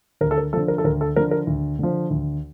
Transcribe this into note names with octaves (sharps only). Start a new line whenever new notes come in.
D2 A#4
A4
A#4
D3 F3 A4
A#4
A4
D2 A#4
A4
D3 F3 A#4
A#4
D2
D3 F3
D2